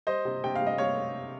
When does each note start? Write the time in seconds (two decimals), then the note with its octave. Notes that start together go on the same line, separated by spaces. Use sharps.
0.07 G3 C5 D#5
0.25 C3
0.44 C3 G5
0.55 F5
0.61 G3
0.67 D#5
0.78 G3 C#5 F5